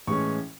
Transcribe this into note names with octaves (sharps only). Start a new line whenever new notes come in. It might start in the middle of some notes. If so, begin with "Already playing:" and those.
A2 E3 G#3 C#4 C#6